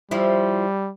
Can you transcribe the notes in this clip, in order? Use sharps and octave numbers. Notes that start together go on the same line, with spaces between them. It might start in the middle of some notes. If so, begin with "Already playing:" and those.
F3 G3 E4